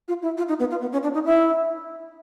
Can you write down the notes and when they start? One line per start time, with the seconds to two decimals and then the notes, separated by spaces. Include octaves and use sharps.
0.08 F4
0.22 E4
0.37 F4
0.48 D#4
0.59 B3
0.71 F4
0.81 B3
0.93 C#4
1.03 D4
1.14 D#4
1.25 E4